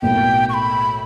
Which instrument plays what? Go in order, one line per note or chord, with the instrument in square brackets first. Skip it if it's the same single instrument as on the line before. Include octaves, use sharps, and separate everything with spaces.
[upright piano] B1 A2 F#3 A#3 [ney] G5
[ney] C#6
B5